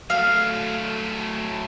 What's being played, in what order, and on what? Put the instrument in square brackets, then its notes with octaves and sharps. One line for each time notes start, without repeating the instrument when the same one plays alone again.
[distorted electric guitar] F#3 A3 [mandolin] F5